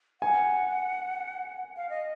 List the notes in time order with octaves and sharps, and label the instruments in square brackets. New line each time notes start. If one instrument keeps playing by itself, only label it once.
[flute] F#5 [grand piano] G#5
[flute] F5
D#5